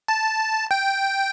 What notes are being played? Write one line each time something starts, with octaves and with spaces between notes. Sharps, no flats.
A5
G5